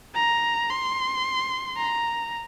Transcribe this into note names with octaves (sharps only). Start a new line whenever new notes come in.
A#5
C6
A#5